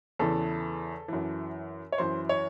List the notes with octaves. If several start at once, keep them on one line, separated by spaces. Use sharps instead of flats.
E2 C#3 E3 A4
F#2 E3
C#5
F#2 E3 C5
C#5